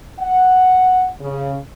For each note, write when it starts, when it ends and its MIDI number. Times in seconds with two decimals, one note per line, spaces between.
0.19 1.09 78
1.20 1.57 49